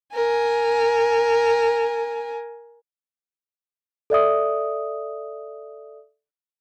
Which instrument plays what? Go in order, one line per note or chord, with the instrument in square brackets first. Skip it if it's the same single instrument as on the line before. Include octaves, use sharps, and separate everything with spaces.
[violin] A#4 G#5
[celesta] A4 D5 E5 D#6